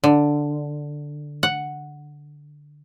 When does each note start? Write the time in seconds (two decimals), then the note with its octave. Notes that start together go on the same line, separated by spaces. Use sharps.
0.04 D3
1.43 F#5